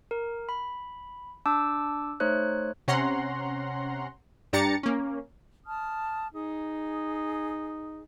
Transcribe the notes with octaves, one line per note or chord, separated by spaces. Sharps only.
A#4
B5
D4 A5 D6 E6
A3 D#4 C5 C#5 F#6
C3 C#4 F#5 A#5 C6
G2 D4 G4 A#5 A6 C#7
A#3 C#4
A5 D#6 F6
D#4 G#4